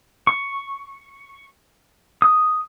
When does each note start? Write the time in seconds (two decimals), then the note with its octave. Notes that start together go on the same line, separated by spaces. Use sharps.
0.27 C#6
2.22 D#6